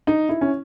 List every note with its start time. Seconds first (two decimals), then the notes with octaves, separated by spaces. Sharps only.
0.07 D#4
0.29 E4
0.41 C#4